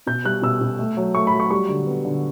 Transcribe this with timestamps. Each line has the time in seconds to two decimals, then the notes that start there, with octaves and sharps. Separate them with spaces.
0.07 B2 G6
0.25 G3 F#6
0.42 B2 E6
0.61 B2
0.79 A3
0.97 F#3
1.15 A3 C#6
1.27 B5
1.33 F#3
1.40 C#6
1.51 G3 C#6
1.69 D3
1.87 B3
2.05 D3